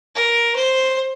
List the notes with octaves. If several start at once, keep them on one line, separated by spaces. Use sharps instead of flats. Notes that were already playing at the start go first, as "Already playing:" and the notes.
A#4
C5